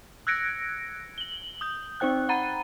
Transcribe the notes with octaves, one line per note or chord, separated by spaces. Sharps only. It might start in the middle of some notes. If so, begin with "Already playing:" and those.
E6 F#6 G#6 A#6 C#7 D7
F#7 G7
D#6 G6
C4 D#4 C5 G5 F#6
F#5 A#5 B5 A6 D#7